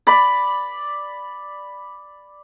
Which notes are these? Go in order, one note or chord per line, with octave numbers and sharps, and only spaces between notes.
D5 B5